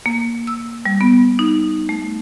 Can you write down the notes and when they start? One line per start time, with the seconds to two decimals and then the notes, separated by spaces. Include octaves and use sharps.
0.06 A#3
0.47 E6
0.86 G3
1.01 B3
1.39 D#4
1.89 A3